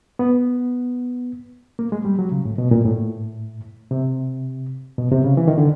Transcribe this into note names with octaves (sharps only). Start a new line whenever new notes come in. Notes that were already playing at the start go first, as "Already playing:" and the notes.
B3
A#3
G#3
G3
F#3
C#3
A2
B2
A#2
A2
C3
B2
C3
C#3
E3
D#3
D3